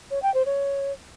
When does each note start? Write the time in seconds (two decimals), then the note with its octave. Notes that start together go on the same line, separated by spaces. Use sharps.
0.11 C#5
0.22 G5
0.34 C5
0.46 C#5